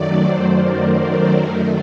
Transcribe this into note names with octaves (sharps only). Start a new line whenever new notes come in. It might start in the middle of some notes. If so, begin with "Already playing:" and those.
Already playing: F#2 D#3 F#3 A3 D5
C5
A#4
A#4
F#2 D#3 A3